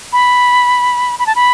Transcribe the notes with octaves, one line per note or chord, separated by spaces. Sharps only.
B5
B5
A5
B5